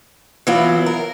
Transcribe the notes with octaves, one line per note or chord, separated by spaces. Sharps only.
E3 F#3 B3 E4 F4
A#4